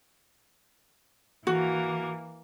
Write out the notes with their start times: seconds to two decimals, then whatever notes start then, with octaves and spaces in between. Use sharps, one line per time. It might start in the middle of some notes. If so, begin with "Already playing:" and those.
1.47 E3 A#3 F#4